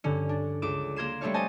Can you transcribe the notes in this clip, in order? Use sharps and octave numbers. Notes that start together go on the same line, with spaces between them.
G2 D3 C#4
D4
C#2 D6 E7
A#3 A#4 C6 G#6 C7 E7
G3 A3 C4 D4 C#5 F5
C5 D#5 G#5 A5 C#6